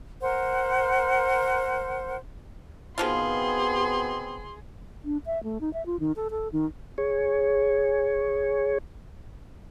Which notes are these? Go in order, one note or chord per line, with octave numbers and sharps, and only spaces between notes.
A#4 C5 F#5
B2 D#3 F3 B3 C4 F4 G#4 C6
D4
E5
A3
D#4
E5
F4
D#3
A4
A4
D#3
G#4 C#5